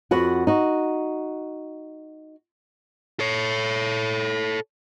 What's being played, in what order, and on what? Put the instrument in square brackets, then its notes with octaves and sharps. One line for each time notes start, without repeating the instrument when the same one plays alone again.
[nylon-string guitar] F2 F#4 B4 F#5
D#4 F#4
[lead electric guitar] A4 C#5